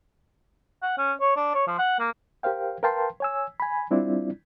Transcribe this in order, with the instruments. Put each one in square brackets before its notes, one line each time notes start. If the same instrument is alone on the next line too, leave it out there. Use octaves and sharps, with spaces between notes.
[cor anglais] F#5
C#4
C#5
D4
C#5
F3
F#5
A#3
[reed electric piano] G4 A#4 C5 F5 G5
A#4 B4 F5 G5 A5 C6
C#5 G#5 E6
G#5 B5
G3 C4 D4 E4 F4 D5